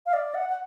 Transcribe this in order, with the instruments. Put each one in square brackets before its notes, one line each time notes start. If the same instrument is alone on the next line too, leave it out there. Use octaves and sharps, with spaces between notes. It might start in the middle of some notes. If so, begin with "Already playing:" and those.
[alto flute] F5
D5
F#5
F#5